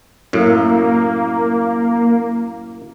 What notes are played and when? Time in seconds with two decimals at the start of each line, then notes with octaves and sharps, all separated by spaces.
0.33 F#2 A2 A#3